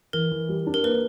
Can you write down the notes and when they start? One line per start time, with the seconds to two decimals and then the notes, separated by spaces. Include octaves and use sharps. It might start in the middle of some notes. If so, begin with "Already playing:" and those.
0.13 E3 A#4
0.32 E3
0.49 G3
0.67 D4
0.74 A#4
0.83 A#3 B4